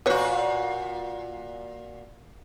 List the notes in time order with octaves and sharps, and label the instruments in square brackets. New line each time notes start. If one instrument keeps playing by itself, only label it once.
[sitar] A#2 F#4 [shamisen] B4 C#5